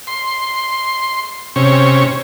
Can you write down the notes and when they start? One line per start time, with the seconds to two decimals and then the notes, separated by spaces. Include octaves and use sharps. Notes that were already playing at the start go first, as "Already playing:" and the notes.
0.07 C6
1.56 C3 C#4